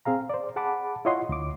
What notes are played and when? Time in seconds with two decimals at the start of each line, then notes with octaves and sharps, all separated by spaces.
0.05 C4 G#4 F5 A#5
0.30 C5 D5
0.56 G#4 F#5 A5 B5 D6
1.05 E4 F4 C#5 D#5 F#5 C6
1.29 D2 D6